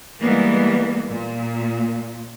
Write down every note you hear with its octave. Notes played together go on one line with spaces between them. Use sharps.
E3 G3 G#3 A#3 B3
A#2